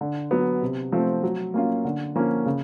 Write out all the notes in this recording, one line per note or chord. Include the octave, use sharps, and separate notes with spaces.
D3
F#3 B3
C3
F3 A3 C4
F#3
A#3 C#4 F4
D3
F3 A#3 C#4
C#3